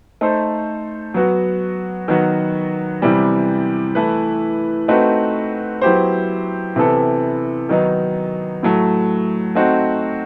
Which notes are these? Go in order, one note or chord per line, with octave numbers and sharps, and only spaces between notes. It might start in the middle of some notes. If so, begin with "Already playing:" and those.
A3 D#4 A4 C5
F#3 B3 F#4
D#3 F#3 B3 F#4 B4
C3 E3 G3 B3
E3 A3 E4 B4
A3 C4 D#4 F#4 B4
F#3 B3 E4 G4 C5
C3 E3 B3 E4 A4
D#3 F#3 B3 D#4
A2 F#3 A3
A3 C4 D#4 F#4